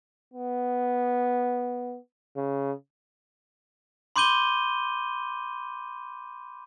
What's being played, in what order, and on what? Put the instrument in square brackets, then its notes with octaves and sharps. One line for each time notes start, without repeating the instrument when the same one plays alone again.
[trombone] B3
C#3
[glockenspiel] B5 C6 D6 G6 D#7 G7